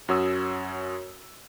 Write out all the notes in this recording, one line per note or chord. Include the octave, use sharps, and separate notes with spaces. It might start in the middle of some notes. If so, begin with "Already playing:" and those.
F#2 F#4 C#5 D#6 E6